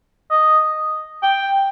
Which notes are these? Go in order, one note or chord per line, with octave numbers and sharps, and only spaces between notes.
D#5
G5